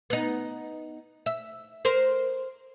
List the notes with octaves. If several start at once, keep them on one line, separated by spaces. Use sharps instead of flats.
B3 D#4
E5
A#4 C5